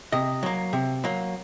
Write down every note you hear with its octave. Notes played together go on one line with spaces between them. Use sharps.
C3 D#5
F#3 A#3
C3
F#3 A#3